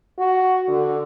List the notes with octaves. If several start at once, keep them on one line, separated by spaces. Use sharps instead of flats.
F#4
D3